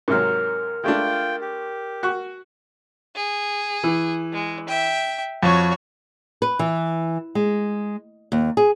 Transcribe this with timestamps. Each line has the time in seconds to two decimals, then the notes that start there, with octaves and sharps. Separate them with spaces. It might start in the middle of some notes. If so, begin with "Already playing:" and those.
0.08 G#2 C3 F#3 A#4 F6
0.84 G#3 A3 D4 F4 G5
1.41 G4
2.03 F#4 C#6 F#6
3.15 G#4
3.84 E3
4.33 G#3
4.68 E5 G5
5.43 F2 F#4 C#5
6.42 B4
6.59 E3
7.35 G#3
8.32 D#2
8.57 G#4